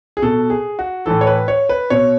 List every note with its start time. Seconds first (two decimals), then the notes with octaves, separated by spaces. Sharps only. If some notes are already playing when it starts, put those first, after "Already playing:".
0.17 G#4
0.22 B2 A4
0.50 G#4
0.79 F#4
1.06 A2 E3 A4
1.21 C#5
1.27 B4
1.48 C#5
1.69 B4
1.90 B2 C#5